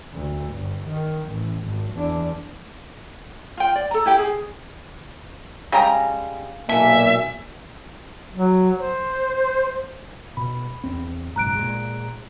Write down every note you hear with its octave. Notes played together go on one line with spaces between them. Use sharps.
D2
G1
D#3
A1
G#1
E2 D4
F4 G5
D5
A4 A#5
E4 G4 G5
G#4
C#3 G3 G#3 G5 G#5 A#5
B1 A#2 E3 A#3 A4 E5 G#5
F#3
C5
B2 B5
E2 C4
F#1 B1 G#2 A#5 F#6 D7
A#2 G#3